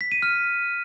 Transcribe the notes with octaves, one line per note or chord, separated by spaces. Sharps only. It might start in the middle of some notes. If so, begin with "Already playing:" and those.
B6
D#7
F6